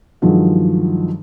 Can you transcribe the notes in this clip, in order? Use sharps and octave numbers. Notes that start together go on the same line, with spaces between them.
G2 D#3 F3 F#3 G#3